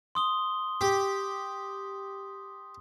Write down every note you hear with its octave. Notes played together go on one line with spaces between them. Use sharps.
C6 D#6 G7
G4